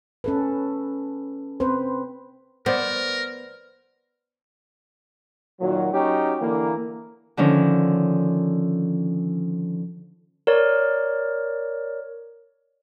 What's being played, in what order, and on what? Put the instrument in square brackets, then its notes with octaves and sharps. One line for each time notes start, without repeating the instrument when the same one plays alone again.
[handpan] C#4 A4 B4
C4 B4 C5
[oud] B3 [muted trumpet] A#4 [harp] C5 D5
[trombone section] A#2 D#3 F#3
F#3 C#4 D#4 F#4 G4
D3 E3 A#3
[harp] D3 D#3 F3 C#4 A#4
[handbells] A#4 C#5 D5